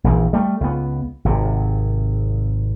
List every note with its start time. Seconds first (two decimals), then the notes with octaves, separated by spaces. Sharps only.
0.04 A#1 D#3 E3
0.33 G3 A3
0.61 C#2 B3
1.25 G#1 C3